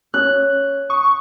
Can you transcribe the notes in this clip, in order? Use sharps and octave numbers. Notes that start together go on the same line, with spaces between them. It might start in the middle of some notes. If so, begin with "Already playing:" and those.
C#4 F#6
C#6 D#6